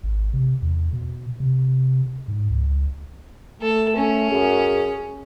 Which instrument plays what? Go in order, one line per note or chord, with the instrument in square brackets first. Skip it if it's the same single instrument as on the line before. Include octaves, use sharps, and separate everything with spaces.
[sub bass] G#1
C3
E2
B2
C3
G#2
C#2
[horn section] A3 [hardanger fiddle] A4
[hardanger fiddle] C#4
[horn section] F#2 [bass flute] G#4